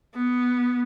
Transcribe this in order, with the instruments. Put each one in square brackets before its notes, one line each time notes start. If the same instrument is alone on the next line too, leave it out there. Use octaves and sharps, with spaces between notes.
[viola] B3